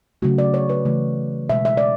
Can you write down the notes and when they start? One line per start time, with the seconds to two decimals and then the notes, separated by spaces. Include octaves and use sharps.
0.22 C#3 F#3 A3 F#4
0.38 D5
0.54 C#5
0.69 B4
0.85 C#3 E3 A3
1.49 B2 G#3 E5
1.65 E5
1.77 D5